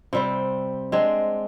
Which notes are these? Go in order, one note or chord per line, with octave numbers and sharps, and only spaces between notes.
C3 G3 C4
G#3 C4 D4